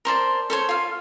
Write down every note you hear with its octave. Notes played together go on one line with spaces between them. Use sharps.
A#4 C5 D5 A5
A4 C5 C#5
F4 F5